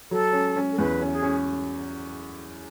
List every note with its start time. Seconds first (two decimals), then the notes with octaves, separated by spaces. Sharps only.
0.11 F#3 A4
0.33 C#4
0.56 C#4
0.72 A4
0.78 E2 B4
1.01 C#4
1.12 G#4
1.23 C#4